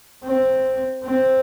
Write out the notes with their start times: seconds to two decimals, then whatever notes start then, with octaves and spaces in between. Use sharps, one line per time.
0.24 C4
1.04 C4